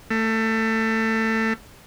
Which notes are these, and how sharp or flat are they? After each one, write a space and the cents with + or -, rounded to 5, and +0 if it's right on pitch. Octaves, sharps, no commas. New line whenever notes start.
A3 +20